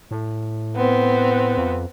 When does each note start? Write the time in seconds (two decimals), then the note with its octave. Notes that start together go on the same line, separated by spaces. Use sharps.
0.11 A2
0.76 B3 C4
1.57 F2